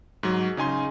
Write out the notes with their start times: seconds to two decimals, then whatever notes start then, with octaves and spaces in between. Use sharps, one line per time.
0.23 G#2 F#3
0.57 C#3 D#4 G#5 C6